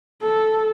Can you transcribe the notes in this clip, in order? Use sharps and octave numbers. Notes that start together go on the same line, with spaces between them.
A4